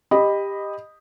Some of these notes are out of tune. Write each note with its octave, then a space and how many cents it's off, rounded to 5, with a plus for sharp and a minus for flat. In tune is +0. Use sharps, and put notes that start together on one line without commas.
G4 +15 D#5 -5 B5 +0